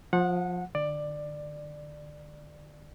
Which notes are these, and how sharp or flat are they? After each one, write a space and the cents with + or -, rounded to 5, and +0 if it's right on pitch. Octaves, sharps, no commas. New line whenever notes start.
F3 +20 F#5 -20
D3 +35 D5 +15